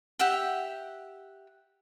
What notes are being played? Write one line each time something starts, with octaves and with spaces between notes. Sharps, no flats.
G4 E5 F#5 G5